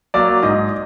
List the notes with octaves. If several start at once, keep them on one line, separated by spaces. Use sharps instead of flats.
F#3 A#3 D5
G#2 D#5